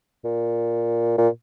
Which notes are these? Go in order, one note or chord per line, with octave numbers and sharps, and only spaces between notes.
A#2
A#2